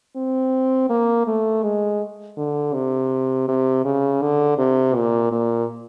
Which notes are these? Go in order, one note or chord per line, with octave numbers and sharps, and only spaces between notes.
C4
A#3
A3
G#3
D3
C3
C3
C#3
D3
C3
A#2
A#2